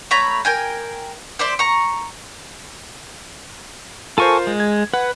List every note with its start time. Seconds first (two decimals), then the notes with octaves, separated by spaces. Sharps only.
0.11 A3 C#5 A#5 B5
0.45 A#4 G5 G#5
1.39 C5 D5 E5 C6
1.59 A#5 C#6
4.18 F4 A4 A#4 C5 G#5 C#6
4.47 G#3
4.60 G#6
4.94 B4 F#5